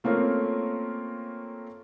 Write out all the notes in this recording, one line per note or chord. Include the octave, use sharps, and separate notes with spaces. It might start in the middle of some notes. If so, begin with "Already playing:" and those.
A3 A#3 C4 C#4 F4 A#4